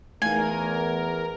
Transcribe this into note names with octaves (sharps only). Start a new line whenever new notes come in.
E2 A3 D#4 A#4 G#5